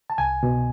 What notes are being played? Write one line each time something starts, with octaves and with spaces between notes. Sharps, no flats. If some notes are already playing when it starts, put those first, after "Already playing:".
A5
C2 G#5
B2